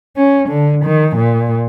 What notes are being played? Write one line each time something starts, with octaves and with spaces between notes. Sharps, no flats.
C#4
D3
D#3
A#2